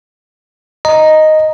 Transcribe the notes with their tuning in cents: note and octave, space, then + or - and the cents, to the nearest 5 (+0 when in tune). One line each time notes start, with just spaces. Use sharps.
D#5 +0 A#5 +0